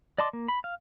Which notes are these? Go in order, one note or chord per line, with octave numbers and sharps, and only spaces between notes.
D5 D#5 A5 C6 D6
A#3
B5
F5